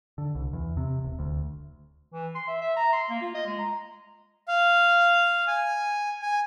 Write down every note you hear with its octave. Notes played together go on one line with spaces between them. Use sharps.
D3
C2
E2
C3
D1
D2
E3
C6
E5
E5
A#5
C6
A#3
F4
D#5
G#3
A#5
F5
G#5
G#5